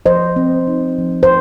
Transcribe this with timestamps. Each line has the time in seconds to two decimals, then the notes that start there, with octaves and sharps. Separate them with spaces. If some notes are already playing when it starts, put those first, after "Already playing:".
0.06 F3 C5 D#5
0.36 C4
0.68 D#4
0.98 F3
1.23 C5